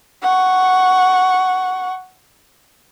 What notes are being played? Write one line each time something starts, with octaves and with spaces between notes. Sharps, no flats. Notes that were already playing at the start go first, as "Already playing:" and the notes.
F#5 C#6